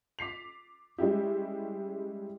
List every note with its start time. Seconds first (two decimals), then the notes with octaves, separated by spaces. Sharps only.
0.19 D6 B6 C7 F7
0.98 G3 G#3 C#4 E4 G4